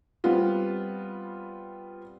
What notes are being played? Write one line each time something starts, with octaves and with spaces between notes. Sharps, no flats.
G3 B3 C4 F4